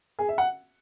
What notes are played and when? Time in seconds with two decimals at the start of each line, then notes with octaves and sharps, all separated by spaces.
0.19 G#4
0.29 E5
0.38 F#5